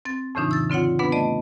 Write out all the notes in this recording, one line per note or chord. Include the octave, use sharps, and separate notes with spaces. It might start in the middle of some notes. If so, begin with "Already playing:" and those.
C4 A6
F2 A2 C#3 E3 D4 D#4
E6 A6
D3 C4 F4 C#5 F#5
B3 D4 B4 F#5
A3 D5 D#5